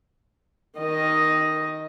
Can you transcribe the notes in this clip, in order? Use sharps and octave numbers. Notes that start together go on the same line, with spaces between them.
D#3 D#5